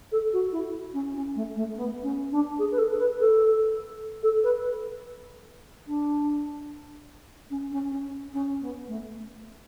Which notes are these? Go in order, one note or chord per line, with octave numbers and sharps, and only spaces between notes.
A4
F#4
E4
C#4
C#4
A3
A3
B3
C#4
D4
G#4
B4
A4
B4
A4
A4
B4
D4
C#4
C#4
C#4
C#4
B3
A3